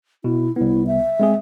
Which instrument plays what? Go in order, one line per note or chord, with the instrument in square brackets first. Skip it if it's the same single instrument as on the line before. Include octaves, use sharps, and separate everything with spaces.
[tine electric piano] B2 [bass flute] E4
[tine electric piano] C2 B3 [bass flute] E4
[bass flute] E5
[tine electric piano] G#3 C4 G#4